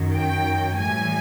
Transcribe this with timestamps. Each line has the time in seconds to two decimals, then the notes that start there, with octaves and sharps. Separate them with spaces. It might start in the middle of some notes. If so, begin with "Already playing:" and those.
Already playing: F#2 D#3 F#3
0.14 G5
0.79 A2 E3 G3 G#5